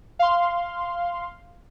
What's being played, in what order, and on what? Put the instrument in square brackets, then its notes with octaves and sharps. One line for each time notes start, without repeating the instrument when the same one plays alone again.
[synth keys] F5 C6